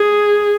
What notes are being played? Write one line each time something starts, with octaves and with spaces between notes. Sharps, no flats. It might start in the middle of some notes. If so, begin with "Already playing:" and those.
Already playing: G#4